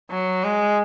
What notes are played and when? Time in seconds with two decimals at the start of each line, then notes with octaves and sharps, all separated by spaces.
0.10 F#3
0.44 G#3